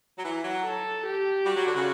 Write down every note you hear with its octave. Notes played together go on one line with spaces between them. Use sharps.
F#3
E3
F#3
A4
G4
G3 F#4
F#3
D3
C#3